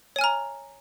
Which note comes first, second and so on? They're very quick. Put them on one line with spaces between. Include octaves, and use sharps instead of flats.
C#5 G#5 F6 A#5